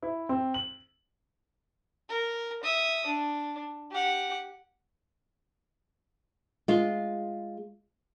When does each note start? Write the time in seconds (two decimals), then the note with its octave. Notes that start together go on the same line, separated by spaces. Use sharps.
0.03 E4
0.29 C4
0.54 F#7
2.09 A#4
2.63 E5 D#6
3.06 D4
3.91 G4 F#5
6.68 G#3 F4